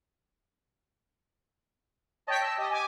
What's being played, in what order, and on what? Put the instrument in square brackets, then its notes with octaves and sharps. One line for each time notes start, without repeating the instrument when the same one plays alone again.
[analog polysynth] C#5 G5 B6 [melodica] D#5 A5
[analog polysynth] E6
[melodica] G4 [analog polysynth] D#5
[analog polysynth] G#5 D6